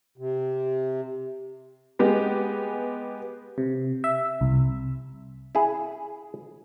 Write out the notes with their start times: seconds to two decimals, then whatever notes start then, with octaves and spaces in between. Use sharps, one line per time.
0.18 C3
1.99 G#3 B3 G4
3.58 C3
4.04 E5
4.41 C2
5.55 E4 G#4